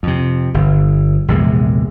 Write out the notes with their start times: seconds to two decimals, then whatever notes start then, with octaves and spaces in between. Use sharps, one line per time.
0.03 F2 C3
0.54 G1
1.28 A#1 E2 C3 G#3